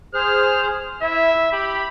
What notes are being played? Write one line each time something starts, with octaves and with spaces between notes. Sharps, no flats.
G#4 C5 F6
E4 E5
G4 B5